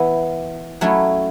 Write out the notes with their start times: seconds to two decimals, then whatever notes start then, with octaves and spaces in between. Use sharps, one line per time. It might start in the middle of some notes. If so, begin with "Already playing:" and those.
Already playing: E3 B3 E4
0.81 F#3 A3 C#4 E4